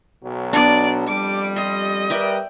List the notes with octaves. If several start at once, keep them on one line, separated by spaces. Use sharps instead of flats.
B1 B2 F#3
B3 D4 D5
F2 G3 D6
D#5 C6
G3 A#4 B4 D5 E5 G5